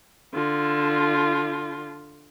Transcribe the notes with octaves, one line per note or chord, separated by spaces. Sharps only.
D3 F4